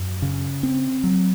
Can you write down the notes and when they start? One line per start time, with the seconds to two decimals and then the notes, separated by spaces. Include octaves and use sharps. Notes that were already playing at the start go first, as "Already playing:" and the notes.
Already playing: F#2
0.22 C#3
0.63 C4
1.04 F#3